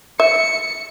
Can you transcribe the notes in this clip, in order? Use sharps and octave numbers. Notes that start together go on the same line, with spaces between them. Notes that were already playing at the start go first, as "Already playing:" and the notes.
E5 C#7